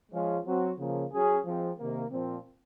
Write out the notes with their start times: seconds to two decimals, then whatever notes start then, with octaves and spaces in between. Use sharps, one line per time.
0.12 F3 G#3 C#4 F4
0.45 F#3 C4 F#4
0.78 C#3 F3 A#3
1.11 F#3 C#4 G#4
1.45 F3 G#3 C4
1.78 C3 D#3 A#3
2.10 A#2 F3 C4